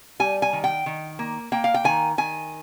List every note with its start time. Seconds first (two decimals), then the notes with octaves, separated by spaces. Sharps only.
0.20 G3 G#5
0.42 G#5
0.53 D#3
0.64 G5
0.86 D#3
1.19 A#3
1.52 A#3 G5
1.64 F5
1.74 G5
1.84 D#3 G#5
2.18 D#3 G#5